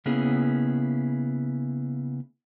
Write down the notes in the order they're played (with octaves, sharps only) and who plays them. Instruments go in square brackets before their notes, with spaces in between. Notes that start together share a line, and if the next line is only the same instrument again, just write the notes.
[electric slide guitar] C#3 A#3 B3 C#4 E4 G#4